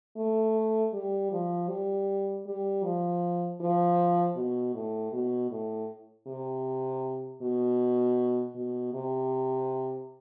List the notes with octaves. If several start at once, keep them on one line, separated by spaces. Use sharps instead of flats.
A3
G3
F3
G3
G3
F3
F3
B2
A2
B2
A2
C3
B2
B2
C3